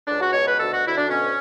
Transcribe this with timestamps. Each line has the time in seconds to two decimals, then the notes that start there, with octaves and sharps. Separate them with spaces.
0.07 C#2 D4
0.21 F#4
0.33 B2 C#5
0.46 B4
0.59 D2 A4
0.72 F#4
0.85 D2 E4
0.97 D4
1.09 B2 C#4